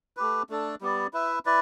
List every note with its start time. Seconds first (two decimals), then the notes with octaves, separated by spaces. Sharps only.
0.17 A3 G4 B4
0.50 A3 D4 A4
0.81 G3 B3 G4 D5
1.13 E4 B4 E5
1.46 E4 B4 D5